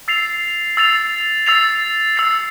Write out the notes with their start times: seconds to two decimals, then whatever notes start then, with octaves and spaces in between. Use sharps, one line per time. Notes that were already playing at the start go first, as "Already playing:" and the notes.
0.08 E6 A6 C7 F7
0.77 E6 A6 C7 F7
1.46 E6 A6 C7 F7
2.16 E6 A6 C7 F7